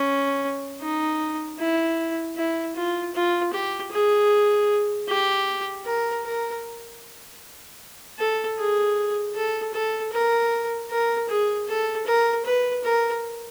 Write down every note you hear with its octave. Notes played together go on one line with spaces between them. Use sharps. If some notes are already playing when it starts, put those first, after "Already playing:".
Already playing: C#4
D#4
E4
E4
F4
F4
G4
G#4
G4
A#4
A#4
A4
G#4
A4
A4
A#4
A#4
G#4
A4
A#4
B4
A#4